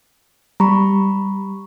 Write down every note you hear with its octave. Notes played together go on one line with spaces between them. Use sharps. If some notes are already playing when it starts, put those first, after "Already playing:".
G3 A#5 B5 C#6